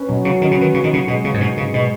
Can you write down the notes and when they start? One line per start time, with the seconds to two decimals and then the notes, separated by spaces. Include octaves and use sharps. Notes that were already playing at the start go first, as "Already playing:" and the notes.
Already playing: C#4 B4
0.08 B2 F#3
0.25 C#3 F#3
0.41 D#3 C#4
0.51 C#3
0.58 D#3 B4
0.74 C#3 F#3
0.84 D#3
0.91 C#3 F#3
1.07 B2 G#3
1.24 C#3 B3
1.34 G#2
1.40 B2 D#4
1.56 G#2 C#3
1.73 B2 G#3